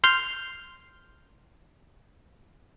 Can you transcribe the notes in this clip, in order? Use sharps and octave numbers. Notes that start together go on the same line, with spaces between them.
C6 F6 G6